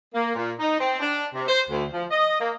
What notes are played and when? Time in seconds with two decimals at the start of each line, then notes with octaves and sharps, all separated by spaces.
0.14 A#3
0.34 A#2
0.59 D#4
0.79 C4
1.00 D4
1.33 C3
1.48 C5
1.69 D2
1.93 F3
2.11 D#5
2.40 A#3